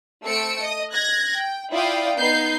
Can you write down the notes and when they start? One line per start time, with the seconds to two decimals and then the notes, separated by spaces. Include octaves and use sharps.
0.24 A3 C4 E6 C#7 D7
0.61 D#5 D#6
0.92 F#6 G#6 A#6
1.35 G5
1.72 E4 F4 D5 F5 G5 D#6
2.17 B3 D#4 G6 C7